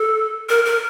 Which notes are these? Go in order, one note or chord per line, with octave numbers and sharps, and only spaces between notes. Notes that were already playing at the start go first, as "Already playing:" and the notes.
Already playing: A4
A#4
A#4